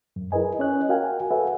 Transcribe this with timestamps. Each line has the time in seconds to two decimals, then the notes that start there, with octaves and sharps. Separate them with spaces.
0.16 F#2
0.32 E4 G#4 A#4 B4 D#5 G#5
0.59 C#4 C#5 D#5 F#6
0.89 F#4 A#4 F5 G5 G#5
1.31 A4 B4 C#5 E5 F#5